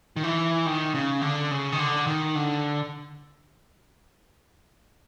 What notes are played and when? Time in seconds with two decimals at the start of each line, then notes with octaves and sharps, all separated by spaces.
0.16 D#3
0.23 E3
0.66 D#3
0.95 C#3
1.22 D3
1.51 C#3
1.72 D#3
1.79 D3
2.07 D#3
2.35 D3